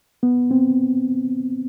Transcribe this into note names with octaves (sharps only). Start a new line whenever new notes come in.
B3
C4